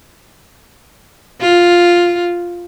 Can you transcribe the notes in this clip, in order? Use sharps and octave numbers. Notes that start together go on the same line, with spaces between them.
F4